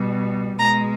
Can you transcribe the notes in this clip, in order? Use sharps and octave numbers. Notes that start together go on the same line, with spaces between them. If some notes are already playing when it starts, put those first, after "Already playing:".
Already playing: B2 G3
B2 G#3 A#5